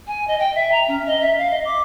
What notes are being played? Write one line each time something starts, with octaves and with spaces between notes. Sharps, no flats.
G#5
D#5
G5
E5
A#5
C#4
D#5
E5
F5
D#5
D6